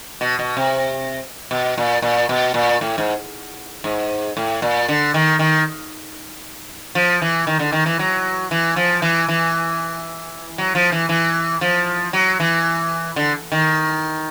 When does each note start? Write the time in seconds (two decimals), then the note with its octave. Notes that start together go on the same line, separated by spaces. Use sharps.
0.21 B2
0.39 B2
0.57 C3
1.51 B2
1.78 A#2
2.02 A#2
2.29 B2
2.54 A#2
2.81 A2
2.98 G#2
3.84 G#2
4.37 A2
4.62 A#2
4.88 D3
5.14 D#3
5.39 D#3
6.95 F3
7.22 E3
7.47 D#3
7.59 D3
7.72 D#3
7.86 E3
7.99 F#3
8.51 E3
8.76 F3
9.02 E3
9.28 E3
10.58 F#3
10.75 F3
10.92 E3
11.09 E3
11.61 F3
12.13 F#3
12.40 E3
13.16 D3
13.52 D#3